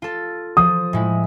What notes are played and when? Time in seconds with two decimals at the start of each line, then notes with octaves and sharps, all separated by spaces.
0.02 F4 A4
0.57 F3 D#6
0.93 A2 G#3 E4